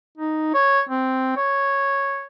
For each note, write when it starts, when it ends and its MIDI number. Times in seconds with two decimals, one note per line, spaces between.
0.18 0.52 63
0.54 0.80 73
0.89 1.35 60
1.37 2.24 73